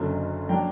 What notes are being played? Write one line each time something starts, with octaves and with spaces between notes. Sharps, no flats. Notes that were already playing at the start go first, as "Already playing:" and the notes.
Already playing: F#1 F#2 D3 F#3 A#3
F#3 A#3 D4 G5 A#5